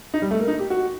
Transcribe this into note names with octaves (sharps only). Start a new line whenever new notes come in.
D#4
G3
A3
A#3
D#4
G4
F#4